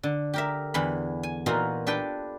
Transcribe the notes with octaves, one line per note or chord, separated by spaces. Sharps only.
D3
G4 A#4 E5
E2 D3 E3 B5
G#5
A#2 E3 D#4 F4 F#4 A#4
D4 G4 A4 B4 G5